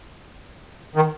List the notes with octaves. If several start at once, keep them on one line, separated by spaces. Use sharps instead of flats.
D#3